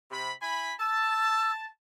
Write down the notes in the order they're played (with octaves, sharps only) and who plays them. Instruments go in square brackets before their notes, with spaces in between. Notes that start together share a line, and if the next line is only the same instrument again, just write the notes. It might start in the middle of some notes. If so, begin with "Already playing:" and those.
[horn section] C3 B5
E4 G#5 B5
[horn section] A5 [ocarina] E6